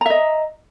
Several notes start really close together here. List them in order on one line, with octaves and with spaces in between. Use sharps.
A#5 E5 D#5